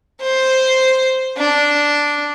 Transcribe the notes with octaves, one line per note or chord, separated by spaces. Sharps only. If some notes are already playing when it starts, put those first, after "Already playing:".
C5
D4